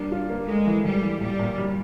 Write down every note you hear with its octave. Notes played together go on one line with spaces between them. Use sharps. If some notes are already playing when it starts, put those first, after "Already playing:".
Already playing: G3 A#3 D4
F4
A#3
G#3 A3
E3
E3 G3
E3
A#2 G3
A#2
G3